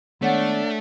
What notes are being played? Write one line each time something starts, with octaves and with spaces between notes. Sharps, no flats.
D#3 G#3 A3 B3 D4 C#5 F#5